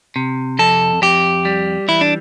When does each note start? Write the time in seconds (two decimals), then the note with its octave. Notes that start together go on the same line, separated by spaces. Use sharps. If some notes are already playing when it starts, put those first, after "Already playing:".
0.16 C3
0.59 F2 A4
1.02 F2 G4
1.45 G3
1.88 E3 E4
2.01 D4